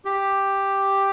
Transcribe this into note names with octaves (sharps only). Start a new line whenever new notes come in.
G4